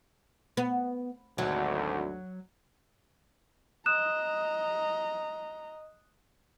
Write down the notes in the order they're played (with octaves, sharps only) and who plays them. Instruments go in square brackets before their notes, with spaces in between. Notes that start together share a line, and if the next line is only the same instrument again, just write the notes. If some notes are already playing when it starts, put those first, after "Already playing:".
[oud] B3
[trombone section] G#1 D2 [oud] F#3
[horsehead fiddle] D#5 A#5 [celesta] D#6 F#6 E7